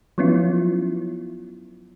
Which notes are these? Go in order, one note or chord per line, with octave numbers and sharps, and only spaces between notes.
F3 F#3 B3 C#4 E4 F4